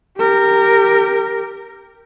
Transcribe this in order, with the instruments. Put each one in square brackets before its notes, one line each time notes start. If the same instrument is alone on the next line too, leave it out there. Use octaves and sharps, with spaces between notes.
[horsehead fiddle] G4 A#4